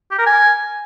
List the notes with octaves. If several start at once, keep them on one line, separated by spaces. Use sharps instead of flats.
G4
A#4
G#5